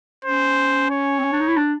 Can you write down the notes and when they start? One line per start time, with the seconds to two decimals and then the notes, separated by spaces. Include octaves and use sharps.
0.25 C#4 C5
0.91 C#5
1.18 C4
1.23 C#4
1.32 D4
1.40 D#4
1.48 E4
1.57 D4